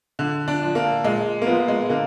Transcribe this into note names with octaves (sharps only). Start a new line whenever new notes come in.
D3
D4
F3
A#3
A#2 G#3
A#3
F3 B3
G#3
D3 A#3